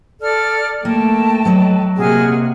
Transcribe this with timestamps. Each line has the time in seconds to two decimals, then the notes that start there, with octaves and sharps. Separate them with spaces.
0.20 A4 D5 F6
0.85 A3 A#3 G5 A5
1.45 F#3 B4 D#5
1.97 C3 A#3 F#4 G#4 F6